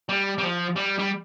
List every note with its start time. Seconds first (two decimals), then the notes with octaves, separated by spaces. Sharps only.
0.09 G3
0.38 G3
0.43 F3
0.76 G3
0.99 G3